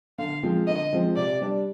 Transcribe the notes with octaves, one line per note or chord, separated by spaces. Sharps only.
D3 F5
F3 G#3 C4 F4
D3 D#5
F3 G#3 C4 F4
C3 D5
G3 D4